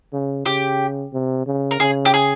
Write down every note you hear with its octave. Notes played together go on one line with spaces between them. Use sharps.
C#3
C#3 G4
C3
C#3
A#4
C#3 G#4
G4
G#4